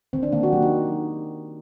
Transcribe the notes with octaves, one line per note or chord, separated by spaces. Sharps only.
D#3 C4
D4
D#3 A#3
F#4
F#3 G4
D#4